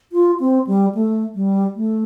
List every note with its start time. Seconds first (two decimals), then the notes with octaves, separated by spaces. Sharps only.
0.12 F4
0.40 C4
0.67 G3
0.95 A3
1.35 G3
1.76 A3